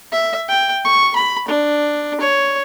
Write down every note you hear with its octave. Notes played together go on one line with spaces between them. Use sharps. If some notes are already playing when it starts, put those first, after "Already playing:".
E5
G5
C#6
B5
D4
C#5